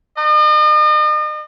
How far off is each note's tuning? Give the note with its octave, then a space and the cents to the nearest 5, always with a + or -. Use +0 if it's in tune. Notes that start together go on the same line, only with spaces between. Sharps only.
D#5 -40